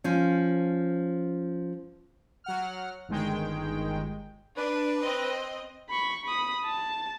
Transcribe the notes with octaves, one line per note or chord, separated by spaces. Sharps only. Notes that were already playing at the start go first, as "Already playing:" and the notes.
F3 C#4
F#3 F#5 F6
G1 D#3 G#3 G5
D4 B4
C4 D#5
B5 C#6
B5 D#6
A5